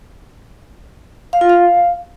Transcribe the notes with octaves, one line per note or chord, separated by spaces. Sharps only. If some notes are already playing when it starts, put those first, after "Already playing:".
F5
F4
F5